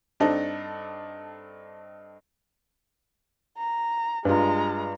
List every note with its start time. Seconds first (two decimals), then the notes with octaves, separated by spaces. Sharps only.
0.20 G2 C4 D4 D#4 A4 D#5
3.58 A#5
4.25 G2 G#3 F4 A#5